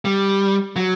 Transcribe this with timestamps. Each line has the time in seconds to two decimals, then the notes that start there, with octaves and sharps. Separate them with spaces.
0.05 G3
0.76 F#3